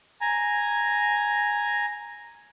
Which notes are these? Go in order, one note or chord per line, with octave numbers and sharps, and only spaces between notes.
G#5 A#5